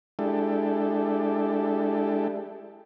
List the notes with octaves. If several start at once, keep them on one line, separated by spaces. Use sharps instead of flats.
G#3 D4 E4 G4 A4